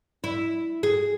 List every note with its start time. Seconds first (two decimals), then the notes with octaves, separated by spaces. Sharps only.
0.24 E4
0.83 G#4